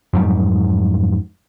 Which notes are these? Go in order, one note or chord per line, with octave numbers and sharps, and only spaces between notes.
F2 G#2 F#3 G3